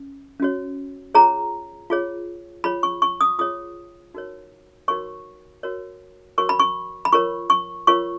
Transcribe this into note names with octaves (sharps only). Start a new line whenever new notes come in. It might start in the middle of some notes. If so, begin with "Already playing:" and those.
Already playing: C#4
C#4 F#4 C#5
F4 G#4 C#5 A#5
F4 G#4 C#5
F4 G#4 C#5 B5
C#6
C#6
D#6
F4 G#4 C#5 D#6
D#4 F#4 A#4 C#5
D#4 F#4 A#4 C#5 C#6
F#4 A#4 C#5
F#4 A#4 C#5 C#6
B5
C#6
B5
F4 A#4 C#5 C#6
C#6
F4 A#4 C#5 C#6